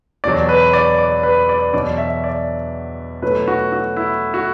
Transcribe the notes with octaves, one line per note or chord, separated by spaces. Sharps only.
E2 B2 F#3 D5
B4
D5
D5
B4
D5
E2 B2 F#3 D5
E5
D5
B2 F#3 A3 B4
F#4
F#4
E4
F#4